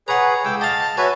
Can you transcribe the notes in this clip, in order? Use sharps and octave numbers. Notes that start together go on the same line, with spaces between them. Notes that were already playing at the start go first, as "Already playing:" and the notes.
G#4 B4 C#5 F#5 A#5
C#2 G5 D6 E6
D#5 F5 A5
F#4 B4 C#5 E5 G#5